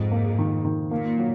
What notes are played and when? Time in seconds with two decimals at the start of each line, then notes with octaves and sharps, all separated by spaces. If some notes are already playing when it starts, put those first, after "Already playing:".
Already playing: F2 G#2
0.12 A#3
0.39 D#3
0.65 D#3
0.91 A#2 A#3
1.18 F#3